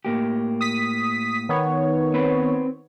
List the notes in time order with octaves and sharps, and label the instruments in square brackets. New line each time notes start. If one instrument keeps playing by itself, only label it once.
[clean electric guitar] A2 A#3 G4
[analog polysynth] D#6 B6
D#3 B3 C#5
[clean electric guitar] C4 B4